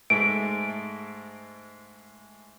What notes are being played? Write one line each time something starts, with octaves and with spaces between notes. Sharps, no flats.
G#2 G#3 A3 D7